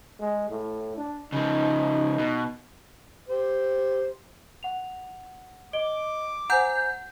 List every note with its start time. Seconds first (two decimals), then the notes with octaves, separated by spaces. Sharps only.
0.20 G#3
0.50 A2
0.97 D4
1.32 C#3 F3 D#4
2.18 B2
3.29 G4 C5
4.63 F#5 F7
5.73 D#5 D6 D7 G7
6.50 C5 F#5 G#5 A#5 G6